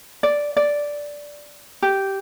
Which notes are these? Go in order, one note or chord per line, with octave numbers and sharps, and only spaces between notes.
D5
D5
G4